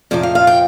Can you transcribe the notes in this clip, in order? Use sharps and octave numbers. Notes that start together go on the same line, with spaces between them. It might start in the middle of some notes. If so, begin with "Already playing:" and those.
F2 C3 F3 D5
F5
F5
G5